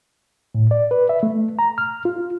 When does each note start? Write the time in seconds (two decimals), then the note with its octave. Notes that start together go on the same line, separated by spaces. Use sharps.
0.55 A2
0.71 D5
0.91 B4
1.09 E5
1.23 A3
1.59 A#5
1.78 F6
2.05 F4